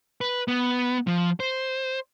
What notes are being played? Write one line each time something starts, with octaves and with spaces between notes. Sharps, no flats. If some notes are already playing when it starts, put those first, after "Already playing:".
B4
B3
F3
C5